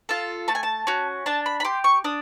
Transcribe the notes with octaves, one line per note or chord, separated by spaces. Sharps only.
F4 A4
A3 A5
G#5
A5
C#4 F#4
D4 A5
B5
B5
G4 C6
C#6
D4 D#6